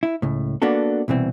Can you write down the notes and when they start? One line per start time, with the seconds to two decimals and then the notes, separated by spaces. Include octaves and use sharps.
0.03 E4
0.22 C#2 A2
0.62 A#3 B3 D4 F#4 A4
1.08 C2 B2 E3 C4